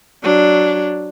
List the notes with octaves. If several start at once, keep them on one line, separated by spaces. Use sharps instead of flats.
F#3 D4